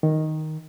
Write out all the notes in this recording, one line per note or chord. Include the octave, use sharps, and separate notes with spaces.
D#3